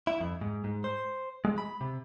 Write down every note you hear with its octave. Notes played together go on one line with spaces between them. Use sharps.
E4
F2
G#2
G#2
C5
G#3
B5
C3